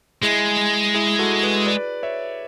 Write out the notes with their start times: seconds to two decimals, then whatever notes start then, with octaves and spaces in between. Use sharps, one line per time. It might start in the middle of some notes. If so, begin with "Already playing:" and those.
0.23 G#3 E4 G#4
0.94 E4 G#4
1.19 F#4 A4
1.43 G#4 B4
1.66 B4 D5
2.03 C#5 E5